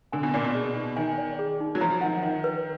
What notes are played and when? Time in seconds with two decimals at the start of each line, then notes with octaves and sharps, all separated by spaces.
0.12 D3 G#5
0.23 B2
0.34 A#2 D5
0.44 B2
0.55 G#4
0.76 D#4
0.96 D#3 G#5
1.18 D5
1.39 G#4
1.60 D#4
1.75 F#3
1.81 F3 A#5
2.01 D#3 F#5
2.23 D#3 D#5
2.44 B4